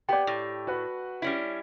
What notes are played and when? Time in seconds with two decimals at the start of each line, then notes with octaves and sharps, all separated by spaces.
0.09 B3 G4 D5 G5 D6
0.27 A2
0.67 F#4 B4 F#5
1.22 G3 C#4 E4